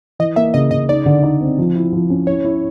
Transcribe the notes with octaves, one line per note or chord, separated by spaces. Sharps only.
E3 D#5
A#3 E5
C#3 D#5
C#3 D#5
D#4 D5
D3
D#4
C4
F3
E4
F3
C#4
E4 C#5
E4